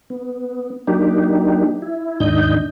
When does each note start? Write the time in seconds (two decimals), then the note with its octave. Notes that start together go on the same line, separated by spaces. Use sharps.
0.10 B3
0.87 F#3 A#3 D4 D#4 G4
1.82 E4
2.20 D#2 G#2 D#3 D4 D#5 G6